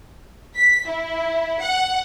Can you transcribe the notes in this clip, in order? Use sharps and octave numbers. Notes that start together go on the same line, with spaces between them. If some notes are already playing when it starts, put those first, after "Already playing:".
B6
E4
F#5